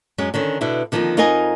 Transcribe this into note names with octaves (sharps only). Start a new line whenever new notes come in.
F#2 G#3 C#4
D3 D#3 C#4
B2 D3 D4 E4
D3 D#3 F3 G#3 A#3 C4
F2 D#4 F4 A#4 D#5 G#5